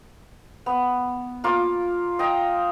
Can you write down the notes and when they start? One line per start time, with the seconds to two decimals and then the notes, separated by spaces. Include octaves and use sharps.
0.66 B3
1.44 A#3 F4 D6
2.19 D#5 G5 A#5